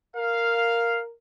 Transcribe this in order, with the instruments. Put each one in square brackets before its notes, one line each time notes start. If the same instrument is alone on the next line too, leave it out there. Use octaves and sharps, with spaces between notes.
[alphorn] A#4 [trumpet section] F5